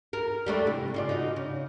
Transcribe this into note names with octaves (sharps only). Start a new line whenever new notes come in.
A#4
G3 A3 D4
C3 E3
C#3 F4 D5
D#4 F#4
C#3